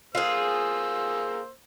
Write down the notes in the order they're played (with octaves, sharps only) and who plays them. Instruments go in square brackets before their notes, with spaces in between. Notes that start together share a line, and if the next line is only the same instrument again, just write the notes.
[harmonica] A#3 C5 E6 [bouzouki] F4 G#4